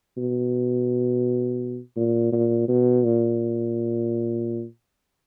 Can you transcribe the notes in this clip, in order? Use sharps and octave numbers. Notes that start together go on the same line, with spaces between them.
B2
A#2
A#2
B2
A#2